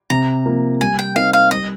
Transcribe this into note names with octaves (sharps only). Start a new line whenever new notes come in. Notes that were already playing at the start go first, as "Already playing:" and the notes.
C3 A#5
F3 A#3
G3 G#5
G5
C4 D#4 A#4 D#5 F5
F5
G3 D#5